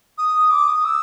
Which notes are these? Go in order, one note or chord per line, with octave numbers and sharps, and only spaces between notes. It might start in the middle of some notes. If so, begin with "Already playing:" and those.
D#6
D6
D#6
E6